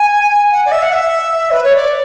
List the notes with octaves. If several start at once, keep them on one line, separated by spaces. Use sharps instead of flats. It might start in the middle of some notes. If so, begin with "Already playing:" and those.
Already playing: G#5
F#5
D5
E5
F#5
E5
B4
C#5
D5